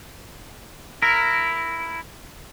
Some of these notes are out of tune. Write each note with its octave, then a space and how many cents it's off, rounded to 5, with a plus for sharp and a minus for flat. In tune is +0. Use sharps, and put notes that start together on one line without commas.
E4 +5 A#4 -5